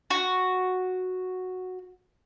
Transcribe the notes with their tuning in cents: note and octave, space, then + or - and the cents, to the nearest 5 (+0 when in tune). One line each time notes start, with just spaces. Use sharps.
F#4 -5